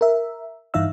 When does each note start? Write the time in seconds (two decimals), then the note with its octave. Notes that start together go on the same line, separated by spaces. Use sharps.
0.01 A#4 E5
0.74 G2 E3 D#4 E5 F5 E6